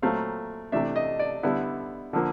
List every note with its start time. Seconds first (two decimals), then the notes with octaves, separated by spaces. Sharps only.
0.02 A#2 F#3 A3 C4 F5
0.72 C3 E3 A3 D4 E5
0.96 D#5
1.19 D5
1.43 D3 G3 B3 E4
2.13 D3 F3 A#3